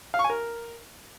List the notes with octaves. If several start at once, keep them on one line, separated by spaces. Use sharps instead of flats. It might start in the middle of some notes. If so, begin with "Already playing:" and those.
F5
C#6
G#5
A#4